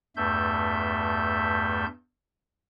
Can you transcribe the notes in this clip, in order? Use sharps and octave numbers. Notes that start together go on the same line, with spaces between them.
E2 G2 A3 E5 G6